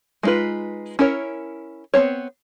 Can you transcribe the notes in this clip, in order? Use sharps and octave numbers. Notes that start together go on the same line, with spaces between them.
G#3 B3 D#4 F4 B4
C#4 E4 A#4 C#5
B3 C4 C5 C#5